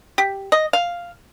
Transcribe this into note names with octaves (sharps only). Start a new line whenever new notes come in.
G4
D#5
F5